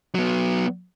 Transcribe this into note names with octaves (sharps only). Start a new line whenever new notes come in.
F#3 B3